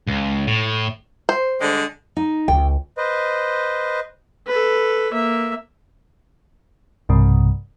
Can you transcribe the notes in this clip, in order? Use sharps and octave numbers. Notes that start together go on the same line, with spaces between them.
C#2
A2
C5
D3 G3 G#3
D#4
C#2 G5
B4 C5 D#5
A4 B4
A#3 E5
B1 G2 C3